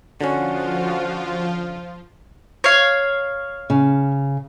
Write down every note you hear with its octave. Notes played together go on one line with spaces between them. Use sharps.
D3 F3 C#4 F4 F#4
C#5 F5
C#3